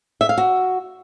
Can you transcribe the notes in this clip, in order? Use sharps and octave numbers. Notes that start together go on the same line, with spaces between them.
E5
F5
F#4